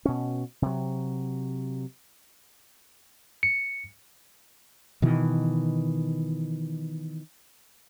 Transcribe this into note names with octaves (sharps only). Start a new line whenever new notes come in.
B2 C#4
C3 F#3
C#7
B2 D#3 E3